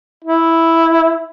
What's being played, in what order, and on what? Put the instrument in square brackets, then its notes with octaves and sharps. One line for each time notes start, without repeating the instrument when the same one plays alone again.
[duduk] E4